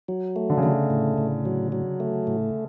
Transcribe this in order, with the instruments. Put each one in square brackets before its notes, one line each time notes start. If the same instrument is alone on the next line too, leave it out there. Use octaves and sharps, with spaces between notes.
[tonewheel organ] F#3
A3
[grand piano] D3
C#3
[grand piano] D3 [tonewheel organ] A3
[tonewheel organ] A2
A2
F#3
F#3
A3
A2